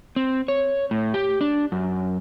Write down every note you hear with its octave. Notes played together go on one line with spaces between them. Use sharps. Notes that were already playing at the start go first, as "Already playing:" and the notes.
C4
C#5
A2
G4
D4
F#2